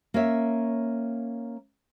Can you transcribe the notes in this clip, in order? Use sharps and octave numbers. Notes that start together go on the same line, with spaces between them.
A#3 C#4 C#5 E5